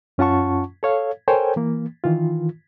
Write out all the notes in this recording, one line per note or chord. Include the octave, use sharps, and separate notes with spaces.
F#2 C#4 F4 F#5 A5 C#6
A4 C#5 F5
A4 A#4 C5 C#5 G5 G#5
E3 A#3
D#3 E3 F4